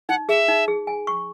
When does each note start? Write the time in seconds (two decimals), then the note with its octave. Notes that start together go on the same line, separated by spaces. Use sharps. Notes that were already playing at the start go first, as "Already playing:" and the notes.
0.09 D#4 F#5
0.29 G#4 E5
0.49 D#4
0.68 G#4
0.87 G#5
1.07 C#6